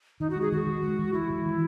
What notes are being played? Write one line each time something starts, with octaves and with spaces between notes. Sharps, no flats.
D#3 D#4
F#4
G#3
G#4
D#3 F#4
D#3
G#3
E3
G#3 E4
E3
D#3